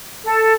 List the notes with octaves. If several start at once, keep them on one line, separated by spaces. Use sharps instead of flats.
A4